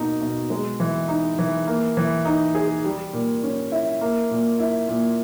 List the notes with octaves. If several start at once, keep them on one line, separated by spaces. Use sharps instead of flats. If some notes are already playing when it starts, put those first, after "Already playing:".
Already playing: B2 A#3 D#4
B2
G#3
E3
D#4
E3
A#3
E3
D#4
G#4
G3
A#2
C#4
E4
A#3
A#2
E4
A#2